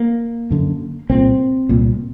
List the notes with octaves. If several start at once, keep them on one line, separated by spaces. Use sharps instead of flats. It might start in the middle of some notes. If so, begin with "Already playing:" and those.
Already playing: A#3
F#2 D3
C2 A#2 C4
C2 A#2